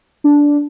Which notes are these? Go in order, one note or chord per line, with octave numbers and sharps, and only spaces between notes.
D4